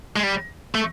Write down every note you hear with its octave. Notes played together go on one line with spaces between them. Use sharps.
G#3
G3
A3